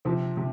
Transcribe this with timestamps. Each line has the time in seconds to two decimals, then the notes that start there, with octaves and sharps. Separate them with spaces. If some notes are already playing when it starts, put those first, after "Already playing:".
0.05 C3 F3 C4
0.37 C3